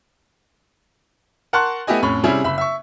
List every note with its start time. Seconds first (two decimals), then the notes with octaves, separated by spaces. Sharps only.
1.53 A#4 F#5 A5 C6 C#6 F#6
1.87 A3 B3 E4 G4 D#5 G#5
2.02 F2 A2 C#4 B5 C#6
2.23 C3 G3 C#4 E4 G#4
2.44 F#1 E5 B5
2.58 E5 C#6